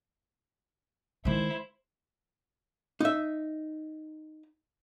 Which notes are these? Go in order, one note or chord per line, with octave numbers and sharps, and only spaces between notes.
D#3 G#3 E4 C5
D#4 E5